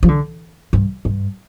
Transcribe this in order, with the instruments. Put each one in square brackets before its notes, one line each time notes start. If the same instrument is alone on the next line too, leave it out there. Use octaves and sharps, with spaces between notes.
[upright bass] F3
D3
G2
G2